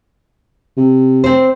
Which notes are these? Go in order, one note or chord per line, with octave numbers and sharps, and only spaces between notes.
C3
C4 C5